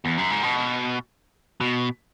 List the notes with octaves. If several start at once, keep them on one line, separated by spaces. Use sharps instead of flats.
E2
F#2
G#2
B2
B2